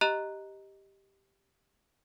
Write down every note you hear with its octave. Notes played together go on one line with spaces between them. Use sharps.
G4 D#5 A#5 F#6 F7